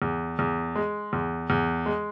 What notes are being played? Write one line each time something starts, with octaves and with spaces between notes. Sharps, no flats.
E2
E2
G#3
E2
E2
G#3